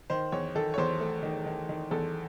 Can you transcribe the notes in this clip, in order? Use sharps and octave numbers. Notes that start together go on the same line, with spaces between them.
D#3 C5
E2 C#5
D#3 A4
C#5
E2 C5
A3
D#3
D#3
D#3
E2 A4